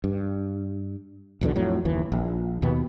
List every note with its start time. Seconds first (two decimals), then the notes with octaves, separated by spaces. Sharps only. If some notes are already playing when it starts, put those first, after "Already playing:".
0.04 G2
1.41 B1 E2 B2 D3
1.56 F2 A2 F#3
1.85 F#1 D#2 E3
2.12 A#1
2.62 D#2 B2 B3